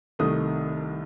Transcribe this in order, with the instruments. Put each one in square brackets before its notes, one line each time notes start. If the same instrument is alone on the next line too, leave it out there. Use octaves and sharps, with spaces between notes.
[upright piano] C2 C3 D#3 A3 D#6